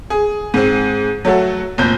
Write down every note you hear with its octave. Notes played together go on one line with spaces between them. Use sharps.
G#4
G#2 C4
F#3 A3 F#4 A4
F1 A#2 G6